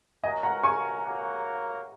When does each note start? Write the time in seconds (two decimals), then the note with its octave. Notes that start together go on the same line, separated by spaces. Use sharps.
0.23 C#4 F#4 A#4 D#5 G#5
0.43 F#5 A#5
0.63 G#5 C#6
1.03 A#3 F#4 A#4 C#5 F#5